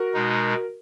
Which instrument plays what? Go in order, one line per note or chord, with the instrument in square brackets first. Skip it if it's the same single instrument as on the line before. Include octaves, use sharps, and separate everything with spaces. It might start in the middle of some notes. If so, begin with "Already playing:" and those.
Already playing: [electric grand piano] F#4 A#4
[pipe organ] B2 G#3 D#4